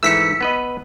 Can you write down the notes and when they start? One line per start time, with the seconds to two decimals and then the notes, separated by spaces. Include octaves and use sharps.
0.03 G#2 E3 A3 E6 B6 C#7
0.41 B3 B4 D#5